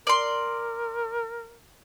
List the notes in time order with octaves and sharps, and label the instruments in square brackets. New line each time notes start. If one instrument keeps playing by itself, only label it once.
[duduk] A#4 [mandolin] D5 C6